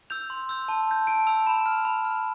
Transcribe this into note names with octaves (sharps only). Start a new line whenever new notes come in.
E6 G6 F7
C6
E6 G6
A5
E6 G6
A5 D7
E6 G6 F7
B5 E7
F6
B5
F6